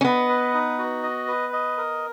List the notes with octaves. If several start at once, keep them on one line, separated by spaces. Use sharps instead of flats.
C#4
B3 D#5
B4
D#4
F#4
D#5
B4
D#5
A#4